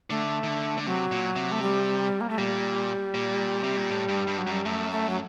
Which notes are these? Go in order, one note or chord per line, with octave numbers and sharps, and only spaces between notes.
D3 A3
D#3
D3
D3
C3 F#3
A#2
C3
A3
G3
A#3
A3
A#2 G3
A#2
C3
A#2
A2
G2
G2
F#3
F#2 G3
F#2 A3
A3
F#3